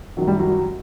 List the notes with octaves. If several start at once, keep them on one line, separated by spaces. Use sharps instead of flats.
F#2 D#3 F#3
G3
F#3